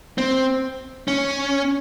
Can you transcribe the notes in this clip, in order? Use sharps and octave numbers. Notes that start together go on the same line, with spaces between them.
C4
C#4